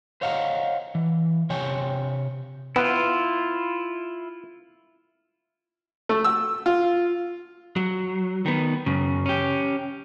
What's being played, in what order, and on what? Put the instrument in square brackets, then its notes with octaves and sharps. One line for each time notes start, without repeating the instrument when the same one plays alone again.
[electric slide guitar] C5 C#5 D#5 F5 F#5 A#5
E3
C3 C#5 G5 G#5
[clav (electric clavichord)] B3 [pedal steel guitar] E4 F4
[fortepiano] A3
E6
F4
[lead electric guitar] F#3
D#3 B3
F#2 C#3
C#4 G4